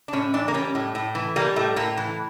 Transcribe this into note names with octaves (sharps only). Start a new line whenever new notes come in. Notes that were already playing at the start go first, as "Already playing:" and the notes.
D4
A2 C#4
E3 D4
A#3
G3 C#4
A2
A2
E3
G3 A#3
A2 A3
A2 A#3
E3